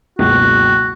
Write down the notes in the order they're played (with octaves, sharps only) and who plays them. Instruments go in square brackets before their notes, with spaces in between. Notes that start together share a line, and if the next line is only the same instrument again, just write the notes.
[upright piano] F#1 C#2 B2 [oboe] F#4